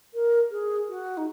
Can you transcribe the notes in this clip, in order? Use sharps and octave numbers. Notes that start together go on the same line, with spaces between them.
A#4
G#4
F#4
D#4